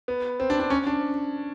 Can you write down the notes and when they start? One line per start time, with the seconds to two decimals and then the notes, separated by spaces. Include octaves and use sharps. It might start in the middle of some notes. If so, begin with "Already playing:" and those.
0.08 B3
0.40 C4
0.50 D4
0.60 D4
0.70 C#4
0.87 D4